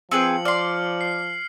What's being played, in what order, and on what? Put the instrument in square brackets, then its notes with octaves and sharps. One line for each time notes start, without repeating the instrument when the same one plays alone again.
[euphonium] F3 [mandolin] C4 G#4 B4 [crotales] C#7 F#7
[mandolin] D5 C6 [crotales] F6
[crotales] C7